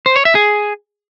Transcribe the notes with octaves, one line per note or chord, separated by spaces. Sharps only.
C5
C#5
E5
G#4